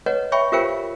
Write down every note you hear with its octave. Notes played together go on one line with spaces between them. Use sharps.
B4 C#5 D#5 F#5
C#5 E5 G5 B5 C#6
F4 G4 A#4 C5 F5 G5